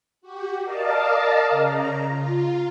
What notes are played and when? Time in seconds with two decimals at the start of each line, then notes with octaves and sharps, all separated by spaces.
0.21 F#4 G4
0.64 A#4 D5 D#5 F5 A5
1.50 C#3 A#5
2.08 F4